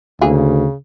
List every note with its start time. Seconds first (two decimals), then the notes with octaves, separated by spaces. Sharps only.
0.21 D2 C#3 E3 A#3 G#4